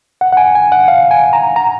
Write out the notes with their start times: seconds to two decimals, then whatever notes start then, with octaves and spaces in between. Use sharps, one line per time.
0.21 F#5
0.33 F#5
0.37 G#5
0.55 G#5
0.72 F#5
0.88 F5
1.11 G#5
1.33 A#5
1.56 A#5